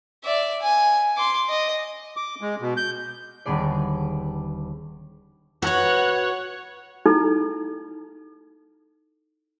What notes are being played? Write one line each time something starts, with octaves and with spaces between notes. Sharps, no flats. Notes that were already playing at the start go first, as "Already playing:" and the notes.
D5 E5
G#5
C6 D6
D#5
D6
G#3
B2
G6
D#1 D3 B3 G#4 D5
F#4 B4 C#5 F#5
D#4 E4 A4